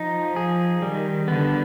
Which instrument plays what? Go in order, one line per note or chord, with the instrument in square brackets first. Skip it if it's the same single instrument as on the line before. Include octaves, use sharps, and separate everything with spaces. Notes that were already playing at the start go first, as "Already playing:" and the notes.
Already playing: [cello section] F3 [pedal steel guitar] D#4
[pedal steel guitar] G#4
[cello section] D#3 [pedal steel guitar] G3
[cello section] D3 [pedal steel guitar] B3